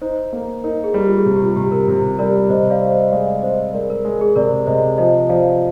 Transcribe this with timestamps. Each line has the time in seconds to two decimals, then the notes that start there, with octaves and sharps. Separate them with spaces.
0.01 D#4 C5
0.33 A#3
0.64 D#4 A#4
0.84 G#4
0.94 G3
1.06 F4
1.17 G#4
1.26 C3 G4
1.36 G4
1.42 F4
1.56 C3 G4
1.72 A#4
1.88 C3
2.19 G3 A#4 D5
2.49 C3 C5 D#5
2.70 D5 F5
2.81 C4
2.91 C5 D#5
3.12 G#3 D5 F5
3.43 C4 C5 D#5
3.74 G#3 A#4 D5
3.90 A#4
4.05 G#3 A#4
4.21 G#4
4.36 C3 A#4 D5
4.67 C3 C5 D#5
4.98 F3 C5 D#5
5.29 F3 D5 F5